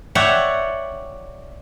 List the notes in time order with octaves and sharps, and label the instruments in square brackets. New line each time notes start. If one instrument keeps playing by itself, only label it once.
[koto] C#5 D5 E5 F#5 G5